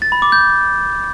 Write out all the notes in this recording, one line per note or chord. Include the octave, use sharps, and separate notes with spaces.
A6
B5
D6
G6